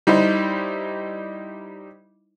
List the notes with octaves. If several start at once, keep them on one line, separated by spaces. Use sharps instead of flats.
G3 D#4 E4 C5